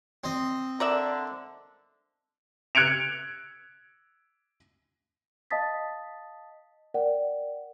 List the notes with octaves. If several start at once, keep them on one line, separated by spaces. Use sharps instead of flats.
C4 D#5
D3 A#4 D5 E5
F#6 G#6 C#7 D7 F7
D#5 F5 A5 D#6 A6 B6
A#4 D5 F#5 G5